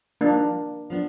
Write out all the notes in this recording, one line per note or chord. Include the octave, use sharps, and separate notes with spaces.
F3 G#3 A#3 D4 D#4
F3 B3 D4